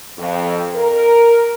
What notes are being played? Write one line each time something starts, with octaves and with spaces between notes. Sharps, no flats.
F2
A#4